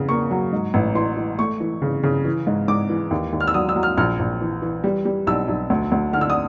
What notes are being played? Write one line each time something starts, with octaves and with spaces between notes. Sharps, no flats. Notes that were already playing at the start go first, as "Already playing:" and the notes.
Already playing: E2 C#3
A#3 C#6
F#3
G#2
A1
E3 C6
E3
A3 C#6
E3
C#3
C#3
E3
G#2
G#2 D6
E3
D#2
D#2
F6
E6
F#3 D#6
E6
F#3
F6
A#1 F6
A#1
E3
E3
G3
G3
B1 E6
B1
D2
D2
D3 F6
E6
D#6